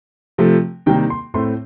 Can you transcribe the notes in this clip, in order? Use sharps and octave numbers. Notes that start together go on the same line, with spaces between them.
C3 F3 A3
C3 D#3 G3 A#3 G5
C6
A2 A3 C4 C6